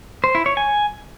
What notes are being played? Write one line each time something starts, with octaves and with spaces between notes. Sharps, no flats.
C5
E4
C#5
G#5